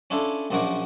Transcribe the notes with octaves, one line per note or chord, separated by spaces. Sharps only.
C#4 D4 E4 F4 A4
A#1 F#2 F3 F#4 A#4 D5